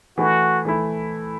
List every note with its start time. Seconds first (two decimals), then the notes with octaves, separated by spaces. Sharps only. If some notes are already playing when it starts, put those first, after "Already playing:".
0.17 E3 A3 E4 F#4
0.65 E3 A3 E4